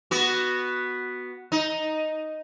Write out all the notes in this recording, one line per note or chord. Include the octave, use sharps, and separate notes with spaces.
B3 F#4
D#4